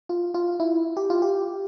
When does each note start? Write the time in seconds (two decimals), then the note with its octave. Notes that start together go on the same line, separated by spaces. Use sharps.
0.09 F4
0.34 F4
0.60 E4
0.97 G4
1.10 F4
1.22 G4